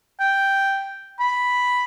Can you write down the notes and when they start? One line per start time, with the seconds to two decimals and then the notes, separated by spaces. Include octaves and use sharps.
0.20 G5
1.20 B5